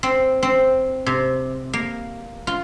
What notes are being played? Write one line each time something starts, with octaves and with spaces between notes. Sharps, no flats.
C4
C4
C3
A#3
F4